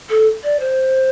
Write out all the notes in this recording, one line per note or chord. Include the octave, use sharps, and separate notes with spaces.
A4
D5
C5